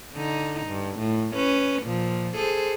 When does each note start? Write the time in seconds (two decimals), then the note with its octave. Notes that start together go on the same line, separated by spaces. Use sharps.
0.14 D3 D#4
0.67 G2
0.99 A2
1.34 C#4 B4
1.83 A#2 F3
2.36 G#4 A4 C5